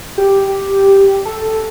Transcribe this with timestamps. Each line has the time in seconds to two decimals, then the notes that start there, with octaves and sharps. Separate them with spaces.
0.18 G4
1.26 A4
1.42 A4